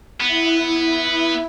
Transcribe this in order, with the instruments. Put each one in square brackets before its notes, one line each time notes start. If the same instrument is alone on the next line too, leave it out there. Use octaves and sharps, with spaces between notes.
[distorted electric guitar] B3 [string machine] E4